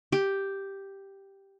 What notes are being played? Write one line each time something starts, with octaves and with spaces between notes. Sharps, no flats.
G4